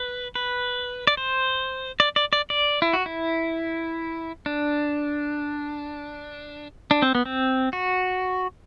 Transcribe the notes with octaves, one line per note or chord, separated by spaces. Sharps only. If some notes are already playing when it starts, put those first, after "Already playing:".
Already playing: B4
B4
D5
C5
D5
D5
D5
D5
E4
F#4
E4
D4
D4
C4
B3
C4
F#4